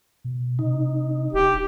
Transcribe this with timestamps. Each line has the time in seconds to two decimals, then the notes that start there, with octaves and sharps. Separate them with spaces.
0.24 B2
0.59 C3 D#4
1.33 D1 G4